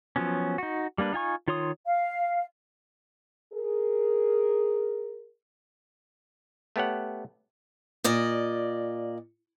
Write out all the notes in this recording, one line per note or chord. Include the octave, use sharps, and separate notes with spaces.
F3 F#3 B3 C#4
D#4 F#4
G3 A#3 D4 B4
D#4 F4 G#5 C#6
D#3 F4 C#5 C6 D#6
F5
G#4 A#4
A3 B3 G4 C#5 F#5
A#2 D5 D#5